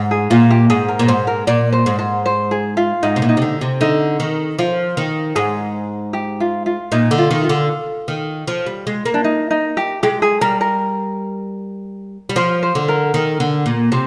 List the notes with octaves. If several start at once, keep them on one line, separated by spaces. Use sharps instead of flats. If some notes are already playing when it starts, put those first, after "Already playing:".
Already playing: G#2
G#4
A#2 F4
G4
G#2 G#4
A#4
A#2
G#2 C5
A#4
A#2 D5
C5
G#2
C5
C5
G#4
F4
G#2 D#4
C3
A#2
D#4
C3
D3
C3
D3 D#4
D#3
F3 F4
D#3
G#2 G#4
G4
F4
F4
A#2 D#4
D3
F4
D#3
F4
D3
D#3
F3
G3
G#3
A#3
D4
D#4
D#4
G4
G#3 G4
G#4
G3 A#4
A#4
G3
F3 C5
C5
D3
A#4
D#3
D3
A#2
C3 C5